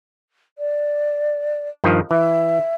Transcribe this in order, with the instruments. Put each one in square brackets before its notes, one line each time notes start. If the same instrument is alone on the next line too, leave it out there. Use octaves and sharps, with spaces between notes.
[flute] D5
[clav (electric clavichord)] G2 D#3 F3
[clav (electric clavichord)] E3 [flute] E5